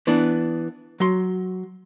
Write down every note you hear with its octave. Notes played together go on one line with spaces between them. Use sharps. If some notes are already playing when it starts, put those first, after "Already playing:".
E3 B3 D4
F#3 C6